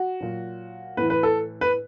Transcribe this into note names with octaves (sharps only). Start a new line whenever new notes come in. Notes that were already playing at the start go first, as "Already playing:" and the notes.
Already playing: F#4
A#2 F#3
A2 E3 B4
B4
A4
B4